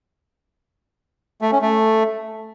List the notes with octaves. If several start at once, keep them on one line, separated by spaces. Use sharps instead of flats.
A3
C#4
A3